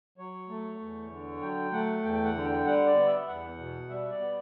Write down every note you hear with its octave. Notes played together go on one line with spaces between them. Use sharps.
F#3 C#5
A3
E2
D3
F#3 G5
A3 F#5
E2 G5
G5
F#5
D3
G5
G3 F#5
D5
B3
E5
E2 F#5
B2
G3 E5
D5
B3